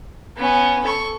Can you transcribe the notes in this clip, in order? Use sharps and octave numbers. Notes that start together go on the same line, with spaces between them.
B3 C#4
A4 C#6